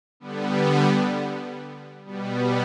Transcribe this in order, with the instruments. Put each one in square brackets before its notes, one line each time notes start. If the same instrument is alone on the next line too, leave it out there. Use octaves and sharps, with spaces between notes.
[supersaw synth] D3 G3 B3
B2 G3 B3